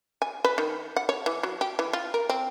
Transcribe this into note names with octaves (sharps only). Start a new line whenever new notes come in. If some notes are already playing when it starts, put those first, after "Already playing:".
G#5
B4
D#3
F#5
C#5
E3
F#3
G4
E3
F4
A#4
C4